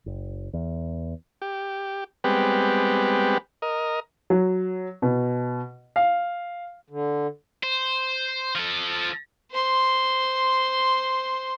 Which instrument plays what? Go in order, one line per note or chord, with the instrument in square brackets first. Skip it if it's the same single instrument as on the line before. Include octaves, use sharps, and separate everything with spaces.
[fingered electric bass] F#1
E2
[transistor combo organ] G4
G3 G#3 B3 C4 G4 B4
A#4 D#5
[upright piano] F#3
B2
F5
[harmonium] D3
[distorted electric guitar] C5
F3 A4
[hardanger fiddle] C5 C6